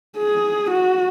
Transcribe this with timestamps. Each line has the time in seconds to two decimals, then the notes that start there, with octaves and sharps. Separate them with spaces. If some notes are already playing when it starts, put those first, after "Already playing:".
0.17 G#4
0.70 F#4